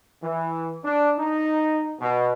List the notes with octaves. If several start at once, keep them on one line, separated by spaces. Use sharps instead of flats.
E3
D4
D#4
B2